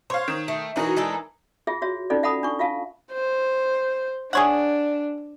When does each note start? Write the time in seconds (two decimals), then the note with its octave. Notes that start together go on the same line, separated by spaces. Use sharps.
0.10 C5 C#5 F5
0.28 D#3
0.48 A3
0.76 E3 F#3 D#4 F#4 A#4
0.96 G#3 D4 A4
1.67 F4 G#4 E5
1.82 F#4 C#5 E5
2.10 C#4 D#4 F4 A4 D5
2.23 E5 F#5 A5 B5 D#6
2.43 D4 C#6
2.59 F4 E5 F5 A5
3.13 C5
4.33 D4 G#4 C#5 F#5